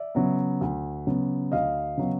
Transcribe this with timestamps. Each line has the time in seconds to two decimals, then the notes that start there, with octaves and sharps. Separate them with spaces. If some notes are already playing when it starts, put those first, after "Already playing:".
Already playing: D5 E5
0.15 C#3 F#3 B3
0.61 D2
1.07 C#3 F#3 B3
1.52 D2 D#5 F5
1.97 C#3 F#3 B3